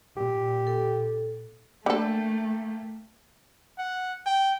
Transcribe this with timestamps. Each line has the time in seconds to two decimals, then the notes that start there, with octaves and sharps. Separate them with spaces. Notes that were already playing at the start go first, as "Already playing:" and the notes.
0.17 A#2 G4
0.67 A4
1.86 D3 A3 A#3 A4 G5
3.78 F#5
4.26 G5